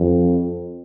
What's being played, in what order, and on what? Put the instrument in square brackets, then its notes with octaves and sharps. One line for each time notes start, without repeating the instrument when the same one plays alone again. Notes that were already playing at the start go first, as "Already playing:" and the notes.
Already playing: [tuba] F2